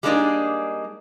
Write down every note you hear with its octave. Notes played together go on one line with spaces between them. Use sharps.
G3 G#3 A#3 D4 D#4 G#4